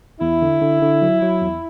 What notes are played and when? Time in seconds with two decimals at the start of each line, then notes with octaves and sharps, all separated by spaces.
0.21 E2 E4
0.42 D3
0.61 D3
0.82 D3
1.02 F#3
1.22 F#3
1.42 E2